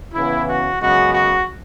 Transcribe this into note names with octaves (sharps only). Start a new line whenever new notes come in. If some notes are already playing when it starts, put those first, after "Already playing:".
C#3 E3 B3 E4
F#4
F#2 C#3 G#3 B3 F#4
F#4